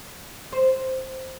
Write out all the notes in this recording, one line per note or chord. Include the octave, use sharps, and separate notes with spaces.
C5